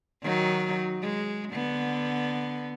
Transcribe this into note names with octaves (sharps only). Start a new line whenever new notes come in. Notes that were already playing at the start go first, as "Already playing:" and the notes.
D#3 F#3 D#4
G#3
D3 B3